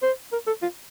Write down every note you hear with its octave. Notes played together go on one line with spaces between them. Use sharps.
C5
A#4
A4
F4